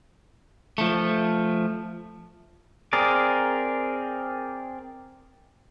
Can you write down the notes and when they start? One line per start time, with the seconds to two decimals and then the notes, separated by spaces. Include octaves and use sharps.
0.78 F3 A3
2.93 C4 G#4 A#4 D5